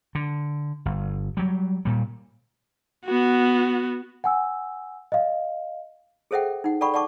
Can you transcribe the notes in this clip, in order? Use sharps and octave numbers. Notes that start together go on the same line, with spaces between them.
D3
G1
F#3 G3
A#2 G3
B3 F#4
F#5 G#5 E6
D#5 F5
G#4 A4 C5 E5 F#5 G5
D#4 F#5
A4 D5 F#5 G5 B5 C#6
D5 F#5 A5 C#6 D6